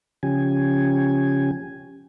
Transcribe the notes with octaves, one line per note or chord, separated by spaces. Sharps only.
C#3 F3 C#4 G4 G#5